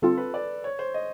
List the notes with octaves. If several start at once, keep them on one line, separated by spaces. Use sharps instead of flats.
D3 G3 C4 F4 A4
B4
D5
C#5
C5
D#5